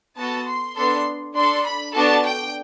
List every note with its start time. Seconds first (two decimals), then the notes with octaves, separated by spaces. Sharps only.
0.17 B3 F#4 A4 A5
0.47 C6
0.76 B3 D4 A4 C6
1.35 D4 A4 C6
1.64 B5
1.93 B3 D4 F#4 A4 A5
2.24 G5